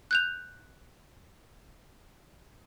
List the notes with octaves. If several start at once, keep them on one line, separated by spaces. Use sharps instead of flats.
F#6 G6 F7